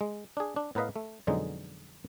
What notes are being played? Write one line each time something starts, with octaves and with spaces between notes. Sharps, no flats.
G#3
D4 G#4
D4
A2 B3 A#4 B4 D#5 F5
A3
F2 B2 D3 F#3 G#3 D#4